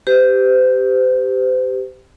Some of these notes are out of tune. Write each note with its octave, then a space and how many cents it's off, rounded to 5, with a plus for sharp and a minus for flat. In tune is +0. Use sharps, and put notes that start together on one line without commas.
G4 +0 C5 -40